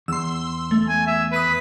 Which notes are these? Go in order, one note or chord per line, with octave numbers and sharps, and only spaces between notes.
E2 C6 E6
A3
G#5
E5
B4 D#6 B6 D#7